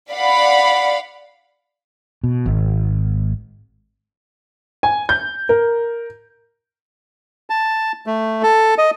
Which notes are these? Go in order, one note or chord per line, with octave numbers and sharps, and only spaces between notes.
D5 F5 F#5 B5
B2
G#1
G#5
G6
A#4
A5
A3
A4
D#5